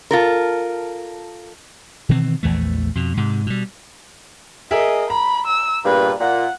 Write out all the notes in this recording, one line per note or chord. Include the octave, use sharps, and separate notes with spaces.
F4 A4 A#4
B2 D#3 E3 C4
A#1 E2 E3 A3
F2 B2
G#2 C3
B2 G3
G#4 A#4 D#5 E5
A#5 B5
E6
E2 G2 A#2 B4
A#2 F#5